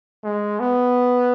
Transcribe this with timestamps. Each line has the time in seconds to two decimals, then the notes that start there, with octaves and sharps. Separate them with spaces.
0.24 G#3
0.60 B3